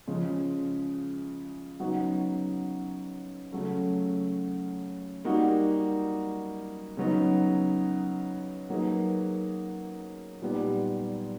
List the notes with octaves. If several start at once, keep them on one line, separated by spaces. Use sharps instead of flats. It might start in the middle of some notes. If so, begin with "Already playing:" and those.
C#3 F3 G#3
C#3 F#3 B3 D#4 F#4
C#3 F#3 A3
G3 A#3 D#4 F#4
C#3 F#3 B3 D#4
F#3 A#3 D#4 G#4 B4
A#2 G3 B3 D#4 G4